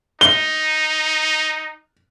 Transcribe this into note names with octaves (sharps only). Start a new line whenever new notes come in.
D#4 G7